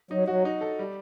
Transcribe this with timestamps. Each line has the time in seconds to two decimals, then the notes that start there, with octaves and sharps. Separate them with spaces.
0.11 F#3 D#4
0.28 F#3 F#4
0.45 D#4
0.61 A4
0.79 G3